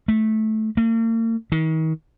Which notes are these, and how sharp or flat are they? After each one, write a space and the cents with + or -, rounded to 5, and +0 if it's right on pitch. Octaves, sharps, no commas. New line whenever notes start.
A3 -15
A#3 -45
D#3 +40